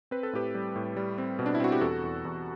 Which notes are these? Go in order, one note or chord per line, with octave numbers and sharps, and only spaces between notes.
C4 B4
A4
A2 G4 B4
G3
A2
G3
C4
B2
D4
E4
C4 F#4
G4
E2 F#4 A4
E2
E2